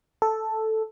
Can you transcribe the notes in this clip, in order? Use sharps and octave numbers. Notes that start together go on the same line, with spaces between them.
A4